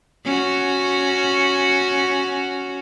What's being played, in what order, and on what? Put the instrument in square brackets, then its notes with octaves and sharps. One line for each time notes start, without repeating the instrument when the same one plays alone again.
[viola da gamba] C#4 F#4